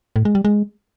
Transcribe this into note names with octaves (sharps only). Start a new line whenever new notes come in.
A2
G#3
G3
G#3